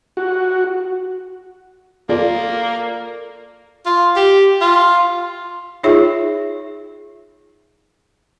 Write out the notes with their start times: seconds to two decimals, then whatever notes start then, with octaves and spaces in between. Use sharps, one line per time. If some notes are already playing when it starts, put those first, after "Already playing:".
0.17 F#4
2.09 A#3 F4 A4 D5
3.86 F4
4.16 G4
4.61 F4
5.83 D#4 F4 G#4 C#5 E5